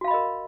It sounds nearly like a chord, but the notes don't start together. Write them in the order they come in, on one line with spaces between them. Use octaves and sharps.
F#4 F5 B5 D#5 A#4